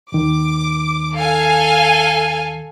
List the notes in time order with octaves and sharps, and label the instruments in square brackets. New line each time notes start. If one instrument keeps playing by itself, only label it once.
[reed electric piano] D#2 D#3 [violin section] D6
[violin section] A4 F5 G#5